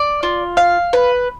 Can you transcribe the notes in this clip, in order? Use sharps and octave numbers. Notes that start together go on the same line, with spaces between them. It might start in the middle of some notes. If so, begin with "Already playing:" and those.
Already playing: D5
F4
F5
B4